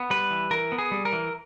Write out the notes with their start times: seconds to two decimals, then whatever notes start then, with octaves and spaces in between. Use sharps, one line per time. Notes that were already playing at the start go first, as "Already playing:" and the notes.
Already playing: B3
0.10 G3 B4
0.31 E3
0.51 E3 A#4
0.72 B3
0.78 G#4
0.91 G3
1.05 A#4
1.13 E3